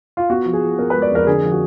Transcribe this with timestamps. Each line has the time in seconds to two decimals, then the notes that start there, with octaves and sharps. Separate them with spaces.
0.17 F4
0.30 B3 F#4
0.46 F3
0.53 G#4
0.62 F3
0.79 B3 A#4
0.90 B4
0.94 G#3
1.02 D5
1.11 F2 A#4
1.27 D3 G#4
1.43 F3
1.52 F#4